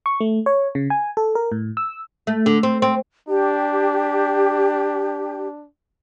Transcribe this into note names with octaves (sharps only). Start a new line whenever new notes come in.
C#6
A3
C#5
C#3
G#5
A4
A#4
A2
E6
A3
D3
C4
C4
D4 G4